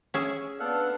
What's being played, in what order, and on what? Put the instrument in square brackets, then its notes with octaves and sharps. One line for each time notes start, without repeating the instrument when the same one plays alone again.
[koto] C#4 G#4 E5
[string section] B3 D4 [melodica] A4 F5 F#5